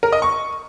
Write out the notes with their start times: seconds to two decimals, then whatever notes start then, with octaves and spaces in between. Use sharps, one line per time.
0.03 A#4
0.13 D#5
0.22 C#6